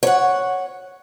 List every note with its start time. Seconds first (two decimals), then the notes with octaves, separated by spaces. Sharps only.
0.03 C#5 F#5